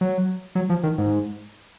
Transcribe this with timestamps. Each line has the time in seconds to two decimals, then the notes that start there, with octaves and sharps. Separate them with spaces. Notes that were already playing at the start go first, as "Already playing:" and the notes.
0.01 F#3
0.55 F#3
0.70 F3
0.83 D#3
0.98 G#2